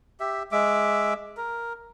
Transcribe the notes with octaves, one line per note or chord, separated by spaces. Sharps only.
G4 E5
G#3 E5 D6
A#4